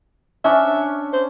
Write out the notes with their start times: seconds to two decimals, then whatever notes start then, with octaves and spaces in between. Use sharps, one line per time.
0.44 C#4 D4 E5
1.13 C5